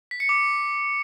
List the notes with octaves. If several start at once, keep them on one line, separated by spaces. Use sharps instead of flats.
B6
C#7
D6